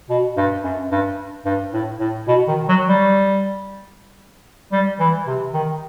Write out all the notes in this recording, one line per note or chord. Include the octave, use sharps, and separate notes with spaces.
B2
G2
F#2
G2
G2
A2
A2
B2
D#3
F#3
G3
G3
E3
C3
D#3